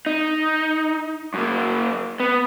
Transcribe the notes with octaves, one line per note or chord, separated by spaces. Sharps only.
D#4
F#2 A#3
B3